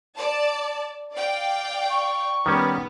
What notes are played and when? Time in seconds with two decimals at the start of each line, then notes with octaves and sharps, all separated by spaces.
0.16 D5 A5
1.13 D5 F5 G5
1.91 C#6
2.46 D#3 G3 B3 C#4